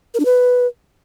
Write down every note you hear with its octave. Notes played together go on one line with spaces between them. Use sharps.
A#4
D4
B4